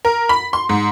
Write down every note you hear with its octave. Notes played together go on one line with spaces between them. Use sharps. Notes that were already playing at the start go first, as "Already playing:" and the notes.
A#4
B5
C6
G#2